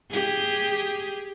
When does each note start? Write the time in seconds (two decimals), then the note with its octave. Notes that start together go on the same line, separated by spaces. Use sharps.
0.11 G4 G#4